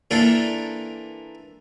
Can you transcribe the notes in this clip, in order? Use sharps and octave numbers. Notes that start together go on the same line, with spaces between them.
E3 A#3 D4 F4 A4